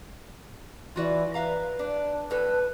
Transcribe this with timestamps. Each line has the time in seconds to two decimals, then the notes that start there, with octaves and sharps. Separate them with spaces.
0.96 E3 F4 F#4 D5
1.34 B4 E5 F5 A#5
1.79 D4
2.31 A2 A4 B4